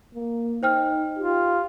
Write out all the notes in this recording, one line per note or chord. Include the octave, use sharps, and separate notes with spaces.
A#3
D#4 C5 G5 F6
F4 G4